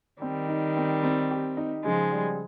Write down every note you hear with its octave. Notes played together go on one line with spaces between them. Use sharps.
D#3 G3 C4
D#4
C4
C4
G4
D#4
C#3 F3 G#3
G3